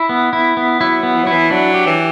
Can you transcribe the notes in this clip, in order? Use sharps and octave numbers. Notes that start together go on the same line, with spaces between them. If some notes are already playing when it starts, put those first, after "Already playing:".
Already playing: E4
B3
E4
B3
F#3 E4
B3
E3
F#3
E3 E4
F#3 D4
G4
E3